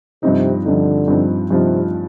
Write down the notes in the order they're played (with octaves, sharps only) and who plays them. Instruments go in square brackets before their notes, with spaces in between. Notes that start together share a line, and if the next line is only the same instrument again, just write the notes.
[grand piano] G2 F3 C4 D#4 [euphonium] C3
[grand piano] G2 F3 C4 D#4 [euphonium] D3
[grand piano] G2 F3 C4 D#4
[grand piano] G2 F3 C4 D#4 [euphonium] C3